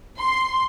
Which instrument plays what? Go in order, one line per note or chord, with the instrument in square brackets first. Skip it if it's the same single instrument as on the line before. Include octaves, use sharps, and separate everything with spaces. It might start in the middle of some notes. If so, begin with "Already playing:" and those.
[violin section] C6